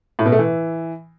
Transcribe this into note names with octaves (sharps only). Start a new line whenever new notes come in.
A2
B2
A3
E3